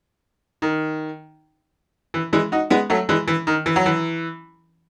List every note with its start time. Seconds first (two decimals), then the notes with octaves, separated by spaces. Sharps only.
0.62 D#3
2.14 E3
2.33 E3 G#3
2.52 D#4 F#4
2.70 G#3 B3
2.90 F#3 A3
3.09 E3 G#3
3.28 E3
3.47 D#3
3.66 E3
3.76 F#3
3.86 E3